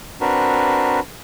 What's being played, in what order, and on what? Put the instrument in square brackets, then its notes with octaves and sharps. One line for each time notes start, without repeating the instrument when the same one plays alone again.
[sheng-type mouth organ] C4 D4 F#4 A#4 B4